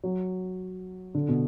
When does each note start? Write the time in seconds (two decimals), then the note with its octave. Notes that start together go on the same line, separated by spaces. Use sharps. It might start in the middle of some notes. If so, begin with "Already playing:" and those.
0.04 F#3
1.14 D3
1.28 B2